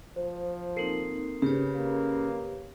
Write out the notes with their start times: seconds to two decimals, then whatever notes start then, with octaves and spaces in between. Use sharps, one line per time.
0.16 F3 C5
0.76 A#3 C4 D#4 A4 A#4 C7
1.42 C#3 G4 B4 C#5
1.74 A#3